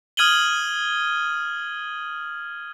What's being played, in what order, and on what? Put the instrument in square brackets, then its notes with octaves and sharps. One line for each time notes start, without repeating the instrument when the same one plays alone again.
[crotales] D#6 F6 G#6 D#7 F#7 G7